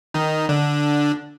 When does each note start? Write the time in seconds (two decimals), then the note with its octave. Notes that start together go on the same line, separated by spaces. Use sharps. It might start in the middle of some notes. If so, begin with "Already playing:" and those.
0.14 D#3 D#4
0.49 D3 D4